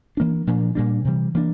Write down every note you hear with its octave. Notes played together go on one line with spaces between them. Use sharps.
E3 A#3 D4
A#2 F3 A#3 D4
A#2 G3 A#3 D4
C3 E3 G3
E3 A#3 D4